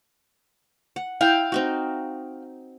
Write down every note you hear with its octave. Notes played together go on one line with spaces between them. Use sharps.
F#5
E4 F5 G5
C4 D#4 F#4